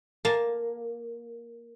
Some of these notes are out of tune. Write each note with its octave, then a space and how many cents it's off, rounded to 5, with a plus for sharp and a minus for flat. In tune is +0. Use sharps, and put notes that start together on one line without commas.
A#3 +5 A5 +0